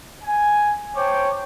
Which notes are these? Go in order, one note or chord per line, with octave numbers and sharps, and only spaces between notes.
G#5
C5 C#5 G5 A5 D6